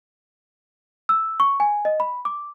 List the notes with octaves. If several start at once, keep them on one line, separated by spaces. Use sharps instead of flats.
E6
C#6
G#5
D#5
B5
D6